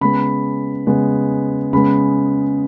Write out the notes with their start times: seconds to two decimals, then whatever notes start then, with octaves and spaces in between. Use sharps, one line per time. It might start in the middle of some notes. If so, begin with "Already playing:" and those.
0.01 C#3 G#3 B3 B5
0.87 C#3 G#3 B3
1.73 C#3 G#3 B3 B5